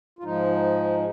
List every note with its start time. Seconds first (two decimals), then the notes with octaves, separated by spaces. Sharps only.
0.19 F4
0.23 G#2 F3 G#3 D#4